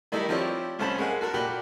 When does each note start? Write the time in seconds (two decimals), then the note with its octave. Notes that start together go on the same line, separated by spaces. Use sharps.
0.12 D#3 G3 A3 D#4 E4
0.29 F3 C4 E4 G4 C#5 D5
0.79 C2 A3 C#4 C5 A5 B5
0.98 G#3 A#3 F#5 G#5
1.21 F#4 A4 A#4
1.34 A#2 F#4 G4 G5 B5